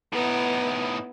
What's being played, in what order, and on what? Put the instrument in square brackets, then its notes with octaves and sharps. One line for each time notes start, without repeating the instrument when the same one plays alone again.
[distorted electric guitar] A2 D#4 [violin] B3 E4